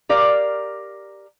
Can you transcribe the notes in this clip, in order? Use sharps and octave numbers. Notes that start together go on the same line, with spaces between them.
G4 A#4 D5 F5